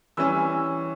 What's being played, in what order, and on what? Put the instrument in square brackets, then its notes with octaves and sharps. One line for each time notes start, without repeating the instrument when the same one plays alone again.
[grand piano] E3 G3 C#4 E6